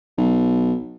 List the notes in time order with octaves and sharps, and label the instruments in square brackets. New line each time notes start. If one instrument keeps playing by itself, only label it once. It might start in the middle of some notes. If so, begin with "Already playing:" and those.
[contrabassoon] B1